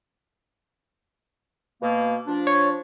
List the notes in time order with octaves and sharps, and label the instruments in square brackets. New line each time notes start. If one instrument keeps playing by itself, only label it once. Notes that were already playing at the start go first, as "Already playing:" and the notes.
[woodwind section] B2 A#3
F3 D4
[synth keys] C#5